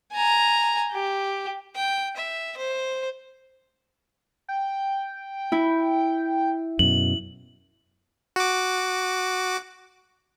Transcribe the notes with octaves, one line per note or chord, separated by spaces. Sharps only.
G#5 A#5
G4
G5
E5
C5
G5
E4
F#2 B2 F#7
F#4 D6